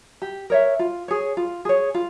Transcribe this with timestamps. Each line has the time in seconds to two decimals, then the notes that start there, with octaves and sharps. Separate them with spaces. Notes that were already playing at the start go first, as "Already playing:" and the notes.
0.22 G4
0.50 A#4 C#5 E5
0.79 F4
1.08 G#4 C#5
1.37 F4
1.65 G#4 C#5
1.94 F4